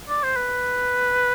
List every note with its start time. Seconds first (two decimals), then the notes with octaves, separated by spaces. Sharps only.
0.09 D5
0.23 C5
0.36 B4